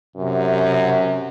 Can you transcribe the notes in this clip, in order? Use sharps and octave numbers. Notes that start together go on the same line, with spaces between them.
F#2 C3